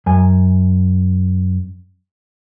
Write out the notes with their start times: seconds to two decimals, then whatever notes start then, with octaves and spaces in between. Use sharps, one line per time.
0.06 F#2 G#5